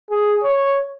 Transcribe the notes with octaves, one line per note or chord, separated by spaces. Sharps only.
G#4
C#5